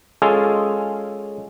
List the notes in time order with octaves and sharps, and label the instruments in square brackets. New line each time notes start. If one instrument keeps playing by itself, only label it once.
[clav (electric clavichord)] G#3 C#4 F4 G#4 A4